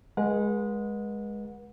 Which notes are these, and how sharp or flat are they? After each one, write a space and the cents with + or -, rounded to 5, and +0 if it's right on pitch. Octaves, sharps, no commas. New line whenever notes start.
G#3 +0 B4 -40 F#5 -30